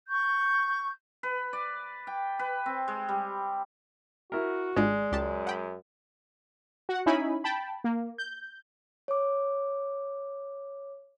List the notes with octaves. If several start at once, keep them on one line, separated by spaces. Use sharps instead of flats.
C#6 G6
B4
D5
G5
B4
C4
G#3
G3
E4 F#4 A#4
G#1 G#3 D4 F4 D5
C#2 F#2 G4 A5
F#5 G5 B5
F#4 F#5
C#4 D#4 E4 G#5 B5
G5 A5 B5
A#3
G6
C#5 D6